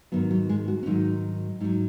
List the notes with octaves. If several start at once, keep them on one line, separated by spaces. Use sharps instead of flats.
G#2 D#3 F#3 B3
F#3
G#3
F#4
C#4
G#2 D#3 F#3 D#4
G#2 F#3 D#4